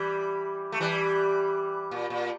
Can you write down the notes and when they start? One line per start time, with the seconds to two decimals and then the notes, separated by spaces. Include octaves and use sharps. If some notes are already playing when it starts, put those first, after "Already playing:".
Already playing: E3 G3
0.72 A3
0.80 E3 G3
1.91 A#2
2.10 A#2